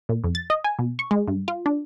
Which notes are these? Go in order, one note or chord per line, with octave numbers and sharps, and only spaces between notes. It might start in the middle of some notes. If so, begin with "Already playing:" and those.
A#2
F2
A6
D#5
G#5
B2
C#6
G#3
G2
F4
D4